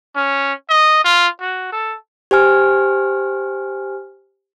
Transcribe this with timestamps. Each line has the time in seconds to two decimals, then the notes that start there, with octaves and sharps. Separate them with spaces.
0.16 C#4
0.70 D#5
1.04 F4
1.40 F#4
1.72 A4
2.31 G4 C5 G#5 F6